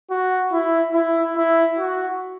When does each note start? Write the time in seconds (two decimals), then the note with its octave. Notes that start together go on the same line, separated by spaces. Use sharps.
0.11 F#4
0.52 E4
0.94 E4
1.36 E4
1.78 F#4